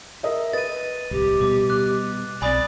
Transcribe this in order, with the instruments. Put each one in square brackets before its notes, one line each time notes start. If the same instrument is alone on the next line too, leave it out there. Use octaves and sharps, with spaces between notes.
[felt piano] A#4 D#5 E5
[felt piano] B4 D#5 [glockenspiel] A6 D#7
[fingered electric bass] D1 C2 [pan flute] G4
[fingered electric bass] B2 G3 [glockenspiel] D6
[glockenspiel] F#6
[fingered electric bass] B1 C4 [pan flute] D5 [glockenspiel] G#5 B5 D#6